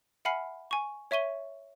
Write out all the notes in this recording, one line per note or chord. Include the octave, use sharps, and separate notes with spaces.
E5 F#5 G#5 B5 F6 C7
G#5 C#6
C#5 E5 C#6 D#7 G7